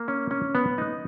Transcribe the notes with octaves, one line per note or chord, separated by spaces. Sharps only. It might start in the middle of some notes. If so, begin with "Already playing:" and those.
Already playing: A#3
C#4
C#4
B3
D#4